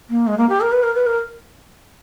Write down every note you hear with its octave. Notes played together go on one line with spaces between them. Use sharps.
A#3
G#3
A#3
G4
A#4
B4
A#4
B4
A#4